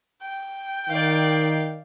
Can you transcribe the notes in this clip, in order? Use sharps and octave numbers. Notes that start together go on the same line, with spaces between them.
G5
D#3 D5 F5